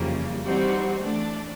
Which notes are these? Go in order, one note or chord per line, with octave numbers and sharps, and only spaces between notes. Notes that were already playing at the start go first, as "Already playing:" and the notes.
Already playing: F2 C#3 E3 G3 A#3
E3 G3 C4 D#4 F#4
E3 A3 D4